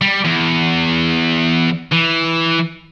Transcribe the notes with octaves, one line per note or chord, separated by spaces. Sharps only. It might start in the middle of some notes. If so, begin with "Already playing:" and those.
G3
E2
E3